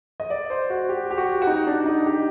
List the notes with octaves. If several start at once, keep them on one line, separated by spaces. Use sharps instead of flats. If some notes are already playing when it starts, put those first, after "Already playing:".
D#5
D5
C5
F#4
G4
G4
F#4
F#4
D#4
D4
D#4
G4